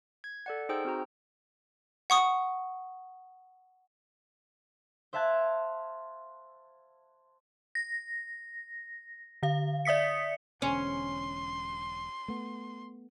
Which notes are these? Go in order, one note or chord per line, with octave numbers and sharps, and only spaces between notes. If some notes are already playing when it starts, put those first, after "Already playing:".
G#6
A4 D5 F#5
D#4 G#4 C5 G5 E6 G6
C4 F#4 A#5
F#5 C#6 D#6
C5 E5 F5 A5 F#6 G#6
A#6
D3 F5
D5 E5 D#6 B6 C#7
E1 A#1 D3 C#4 C6
A3 B3